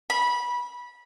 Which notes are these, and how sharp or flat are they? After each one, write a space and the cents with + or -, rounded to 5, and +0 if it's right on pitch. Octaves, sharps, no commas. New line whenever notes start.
B5 -20